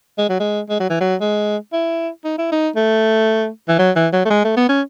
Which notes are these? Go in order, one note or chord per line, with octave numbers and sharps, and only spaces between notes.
G#3
F#3
G#3
G#3
F#3
E3
F#3
G#3
E4
D#4
E4
D#4
A3
E3
F#3
E3
F#3
A3
G#3
A3
B3
C#4